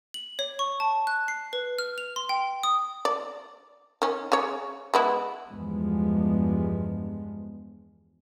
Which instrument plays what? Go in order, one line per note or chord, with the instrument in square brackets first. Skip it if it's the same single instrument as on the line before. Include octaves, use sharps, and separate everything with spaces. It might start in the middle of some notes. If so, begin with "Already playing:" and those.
[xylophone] F#7
C#5
C#6
A5
F#6
C7
B4
F6
F7
C6
G5
D#6
[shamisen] D5
D#3 C#4
C#3 C#5
G#3 B3 E4
[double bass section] E2 G2 F3 G#3 B3